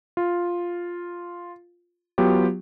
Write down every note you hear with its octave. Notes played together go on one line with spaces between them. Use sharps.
F4
F#3 B3 F4 G4